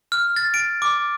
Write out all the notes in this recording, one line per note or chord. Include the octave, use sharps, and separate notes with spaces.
F6
A6
D7
D6